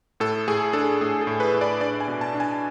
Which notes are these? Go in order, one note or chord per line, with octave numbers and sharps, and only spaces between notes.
A2 A4
A2 G#4
D4 A4
A2 G#4
A4
A2
B4
A2
D5
D4 D5
G#5
B2
A5
D4
G#5